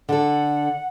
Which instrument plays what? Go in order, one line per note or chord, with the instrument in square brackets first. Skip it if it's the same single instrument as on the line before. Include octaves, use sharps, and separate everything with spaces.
[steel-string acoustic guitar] D3 A4 [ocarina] F#5